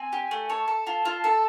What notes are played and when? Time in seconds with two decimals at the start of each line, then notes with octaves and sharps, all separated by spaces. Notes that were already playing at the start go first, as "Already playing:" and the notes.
Already playing: C4 G#5
0.13 G4
0.31 A3
0.50 C#5 A5
0.68 A4
0.87 F4
1.05 F4
1.24 A4